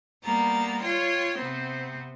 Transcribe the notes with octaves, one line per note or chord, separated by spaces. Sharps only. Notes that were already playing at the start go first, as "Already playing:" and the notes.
G3 A#3 B3 A#5 A6
F4 C#5 G5 C6
C3 B3 C4